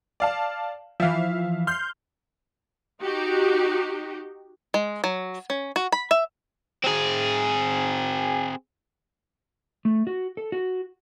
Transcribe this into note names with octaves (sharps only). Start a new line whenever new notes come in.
D5 F5 A5
E3 F3 E5 F5
C6 F6 G6
D#4 F#4 G4
G#3
F#3
C#4
F#4
B5
E5
C4 G#4
A3
F#4
A4
F#4